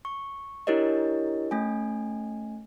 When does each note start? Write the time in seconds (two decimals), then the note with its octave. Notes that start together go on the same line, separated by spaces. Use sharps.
0.05 C#6
0.67 D4 E4 G4 A#4 C#5 D#5
1.51 A3 C#4 G#5